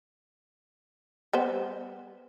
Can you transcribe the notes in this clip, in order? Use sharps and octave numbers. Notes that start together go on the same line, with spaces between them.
G3 B3 C5